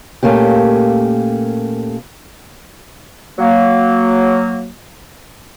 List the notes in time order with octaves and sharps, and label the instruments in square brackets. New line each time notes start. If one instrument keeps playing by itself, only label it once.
[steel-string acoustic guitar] A#2 A3 A#3 C#4 G4
[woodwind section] F#3 A#3